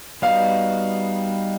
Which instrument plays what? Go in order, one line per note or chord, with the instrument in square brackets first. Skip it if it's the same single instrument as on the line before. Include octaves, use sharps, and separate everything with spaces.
[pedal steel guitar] G3 B3 D#4 F#4 [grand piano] F5